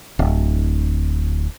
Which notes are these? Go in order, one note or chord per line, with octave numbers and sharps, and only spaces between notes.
D1